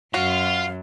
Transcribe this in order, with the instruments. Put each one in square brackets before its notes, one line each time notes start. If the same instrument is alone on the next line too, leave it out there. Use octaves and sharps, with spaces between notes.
[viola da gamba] F#2 [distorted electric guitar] F4 [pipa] F#4 [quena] F5